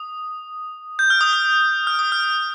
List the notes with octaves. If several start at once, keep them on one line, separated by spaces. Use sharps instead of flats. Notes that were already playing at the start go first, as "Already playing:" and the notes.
Already playing: D#6
G6
F6
D#6
F6
F6
D#6
F6